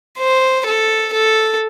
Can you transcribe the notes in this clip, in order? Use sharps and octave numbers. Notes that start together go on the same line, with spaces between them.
C5
A4
A4